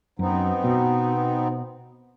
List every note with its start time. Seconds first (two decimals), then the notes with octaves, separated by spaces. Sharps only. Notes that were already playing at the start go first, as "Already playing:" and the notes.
0.19 F#2 B3 C4 D#4
0.64 B2